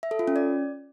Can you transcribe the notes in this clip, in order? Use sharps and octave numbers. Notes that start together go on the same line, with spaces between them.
E5
A4
F4
C#4
D5